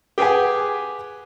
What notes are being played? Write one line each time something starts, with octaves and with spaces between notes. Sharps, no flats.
G4 G#4 B4 F#5 G#5